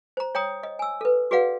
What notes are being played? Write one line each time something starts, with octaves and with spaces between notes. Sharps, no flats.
C5 A#5
C#5 G5 A#5 D#6
D#5
G#5 E6
A4 B4
F#4 G#4 B4 D5 F5 F#5